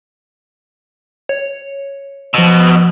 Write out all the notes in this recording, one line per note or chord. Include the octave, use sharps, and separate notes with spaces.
C#5
B2 F3 E6